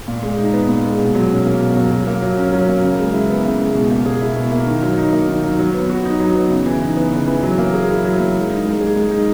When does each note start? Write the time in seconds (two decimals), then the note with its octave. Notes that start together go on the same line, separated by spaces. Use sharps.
0.08 A#2
0.22 G#3
0.38 D#4
0.53 B3
0.68 A#2
0.84 G#3
0.99 B2
1.15 F#3
1.30 C#4
1.45 A#3
1.61 B2
1.76 F#3
1.91 F#3
2.07 A#3
2.22 F#3
2.37 C#4
2.52 F#3
2.68 A#3
2.84 C#3
2.99 G#3
3.13 E4
3.30 B3
3.44 C#3
3.60 G#3
3.75 B2
3.91 A#3
4.06 G#4
4.21 E4
4.36 B2
4.52 A#3
4.67 D#3
4.82 F#3
4.98 D#4
5.13 A#3
5.28 D#3
5.43 F#3
5.59 F#3
5.74 B3
5.90 F#4
6.05 D#4
6.20 F#3
6.36 B3
6.51 C#3
6.66 E3
6.82 D#4
6.97 B3
7.12 C#3
7.28 E3
7.43 F#3
7.58 A#3
7.74 G#4
7.89 E4
8.04 F#3
8.19 A#3
8.35 G#3
8.50 D#4
8.65 G#3
8.80 G#4
8.96 G#3
9.11 D#4